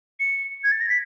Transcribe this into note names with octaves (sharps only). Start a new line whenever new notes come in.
C#7
G#6
A6
A#6
B6